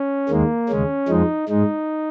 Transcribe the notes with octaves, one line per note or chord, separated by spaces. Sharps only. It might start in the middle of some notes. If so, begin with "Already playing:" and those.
Already playing: C#4
D#2 D#3 G#3 A#3
D#2 C#3 G#3 C#4
F2 F3 G#3 D#4
G#2 G#3 D#4